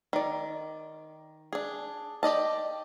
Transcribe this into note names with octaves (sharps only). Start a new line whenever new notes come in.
D#3 D5
D4 G#4
G4 D5 D#5 A5